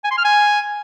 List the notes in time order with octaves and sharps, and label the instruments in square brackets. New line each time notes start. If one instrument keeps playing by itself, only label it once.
[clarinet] G#5
C6
F6
G#5